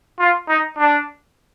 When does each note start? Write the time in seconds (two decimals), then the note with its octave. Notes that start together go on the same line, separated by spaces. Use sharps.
0.19 F4
0.49 D#4
0.78 D4